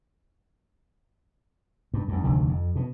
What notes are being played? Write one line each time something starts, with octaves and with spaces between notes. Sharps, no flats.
G2
E2 G2
F1 D2 D3 D#3
F2
B2